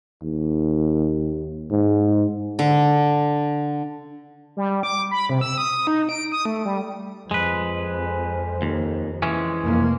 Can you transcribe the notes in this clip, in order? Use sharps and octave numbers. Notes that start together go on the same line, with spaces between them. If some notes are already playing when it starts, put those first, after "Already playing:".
D#2
G#2
D3
G3
D6
B5
C3
E6
D#6
D#4
D7
D#6
A3
G3
F2 G#3 B4
D#2
E3 G#3 C#4
F1 A#3